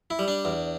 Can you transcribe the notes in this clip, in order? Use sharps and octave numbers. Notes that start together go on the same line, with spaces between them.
E4
G3
D4
E2